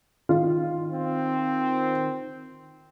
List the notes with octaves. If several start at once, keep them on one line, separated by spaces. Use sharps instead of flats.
D#3 F4
C4